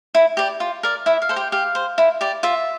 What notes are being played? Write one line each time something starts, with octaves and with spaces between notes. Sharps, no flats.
E4
G4 D5
F4
A#4 D5
E4 E5
F5
A4 C5
G4 G5
G4 F5
C5
E4
G4 D5
F4 E5